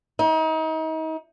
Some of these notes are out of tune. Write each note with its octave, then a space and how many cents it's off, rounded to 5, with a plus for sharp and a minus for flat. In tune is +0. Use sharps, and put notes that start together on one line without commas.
D#4 +35